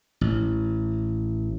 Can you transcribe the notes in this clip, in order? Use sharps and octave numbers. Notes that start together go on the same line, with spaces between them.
A1